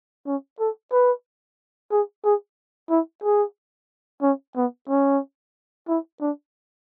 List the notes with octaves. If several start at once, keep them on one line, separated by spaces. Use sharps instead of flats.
C#4
A4
B4
G#4
G#4
E4
G#4
C#4
B3
C#4
E4
D4